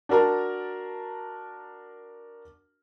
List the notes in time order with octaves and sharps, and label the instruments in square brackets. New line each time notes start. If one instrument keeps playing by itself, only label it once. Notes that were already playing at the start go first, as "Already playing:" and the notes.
[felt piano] D4 F#4 A#4 A5 A#5